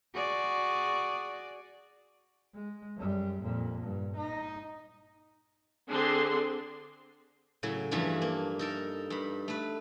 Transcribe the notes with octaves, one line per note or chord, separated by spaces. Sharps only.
F#4 G#4 D5
G#3
F#2 G3
F2 A#2
G2
D#4
D3 C4 D4 G#4 C6
A2 C#3 F#3
G2 E3 F3 A3 C#4 D4
A#3
D#4 A4 A#4
G2 B5
A3 B4